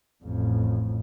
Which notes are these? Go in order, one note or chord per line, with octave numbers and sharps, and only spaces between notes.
A1 F2